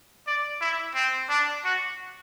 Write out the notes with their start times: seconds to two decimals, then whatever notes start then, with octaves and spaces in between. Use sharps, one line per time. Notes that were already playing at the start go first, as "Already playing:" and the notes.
0.27 D5
0.61 E4
0.95 C4
1.29 D4
1.64 F#4